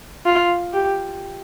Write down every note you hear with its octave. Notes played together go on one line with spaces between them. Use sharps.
F4
G4